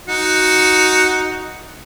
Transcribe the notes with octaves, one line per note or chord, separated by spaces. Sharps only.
D#4 F#4